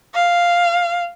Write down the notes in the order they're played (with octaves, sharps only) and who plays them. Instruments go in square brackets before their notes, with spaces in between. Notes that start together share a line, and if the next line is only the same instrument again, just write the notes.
[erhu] F5